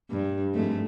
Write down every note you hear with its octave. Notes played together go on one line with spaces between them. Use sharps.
G2
F2 G#2 A3